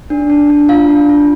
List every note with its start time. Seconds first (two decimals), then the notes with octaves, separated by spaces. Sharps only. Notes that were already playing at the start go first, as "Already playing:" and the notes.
0.10 D4
0.30 D4
0.50 D4
0.69 F4 F5
0.89 D4
1.09 F4